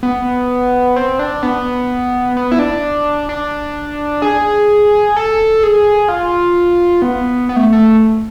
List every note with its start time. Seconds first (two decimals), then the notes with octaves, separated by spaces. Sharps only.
0.03 B3
0.96 C4
1.19 D4
1.43 B3
2.37 B3
2.52 E4
2.59 D4
3.29 D4
4.22 G#4
5.17 A4
5.63 G#4
6.09 F4
7.02 B3
7.49 B3
7.56 A3
7.73 A3